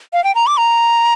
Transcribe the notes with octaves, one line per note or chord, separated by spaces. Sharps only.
F5
G5
A#5
D6
A#5